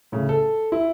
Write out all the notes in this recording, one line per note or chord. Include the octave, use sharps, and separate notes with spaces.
A2 C#3
A4
E4